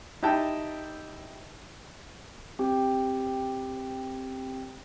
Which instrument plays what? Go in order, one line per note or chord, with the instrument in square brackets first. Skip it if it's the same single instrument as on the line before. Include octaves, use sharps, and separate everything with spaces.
[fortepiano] D#4 E4 G4 G5 A5
[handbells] C4 G4 G5